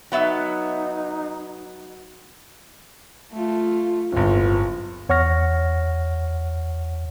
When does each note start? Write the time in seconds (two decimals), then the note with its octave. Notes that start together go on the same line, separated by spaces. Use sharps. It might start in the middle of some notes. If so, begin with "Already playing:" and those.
0.12 F#3 B3 D#4 E5
3.33 A3 F4
4.12 D1 G1 F4
5.09 E2 C#5 F#5 C#6 F6 A#6